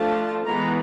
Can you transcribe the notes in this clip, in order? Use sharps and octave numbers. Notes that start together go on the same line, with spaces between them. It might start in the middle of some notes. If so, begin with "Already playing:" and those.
Already playing: F3 A3 D4 F4 A5
E3 G#3 B3 A#5